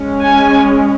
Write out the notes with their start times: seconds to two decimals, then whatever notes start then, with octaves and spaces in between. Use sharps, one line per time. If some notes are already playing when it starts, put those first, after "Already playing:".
Already playing: G#3 C#4
0.20 G#5